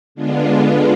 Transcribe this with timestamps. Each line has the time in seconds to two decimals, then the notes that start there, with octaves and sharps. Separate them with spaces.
0.15 D3 G#3 B3 D4 F4